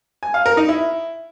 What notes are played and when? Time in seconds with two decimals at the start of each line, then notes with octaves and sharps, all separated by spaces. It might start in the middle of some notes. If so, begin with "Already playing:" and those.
0.23 G#5
0.34 F5
0.46 A#4
0.57 D#4
0.69 E4